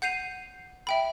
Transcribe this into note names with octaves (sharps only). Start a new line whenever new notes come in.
F#5 G6 C7 D#7 F7
E5 G5 B5